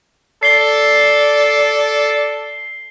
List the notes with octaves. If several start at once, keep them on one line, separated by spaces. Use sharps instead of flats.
A4 D5 C7 G7